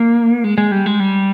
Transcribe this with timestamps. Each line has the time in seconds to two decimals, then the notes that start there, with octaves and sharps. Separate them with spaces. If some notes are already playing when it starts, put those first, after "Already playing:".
Already playing: A#3
0.44 G#3
0.58 G#3
0.72 G3
0.86 G#3
1.00 G3